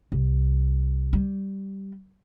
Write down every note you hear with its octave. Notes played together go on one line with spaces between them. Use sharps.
C2
G3